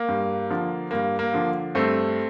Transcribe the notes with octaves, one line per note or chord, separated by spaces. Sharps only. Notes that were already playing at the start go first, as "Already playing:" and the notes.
Already playing: A#3
G2
D3 F3
G2 A#3
A#3
D3 F3
G2 A3 C4